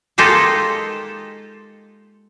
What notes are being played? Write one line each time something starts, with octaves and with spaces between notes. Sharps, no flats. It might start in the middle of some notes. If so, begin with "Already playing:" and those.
G#3 A#3 D#4 F4 G4 A4